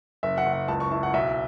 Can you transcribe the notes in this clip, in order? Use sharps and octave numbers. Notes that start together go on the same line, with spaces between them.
F#1 E5
F#5
F#1
F#5
C#2 A5
C#6
E4 A5
F#5
B1 E5